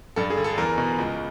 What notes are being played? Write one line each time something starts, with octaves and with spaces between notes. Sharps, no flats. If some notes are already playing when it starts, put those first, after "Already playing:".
G2 A4
G#4
D3
A4
E2 A#4
B2
C#2